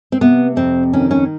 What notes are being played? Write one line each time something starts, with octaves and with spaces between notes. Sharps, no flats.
C4
C3 B3
F2 C4
D#3 C#4
C#4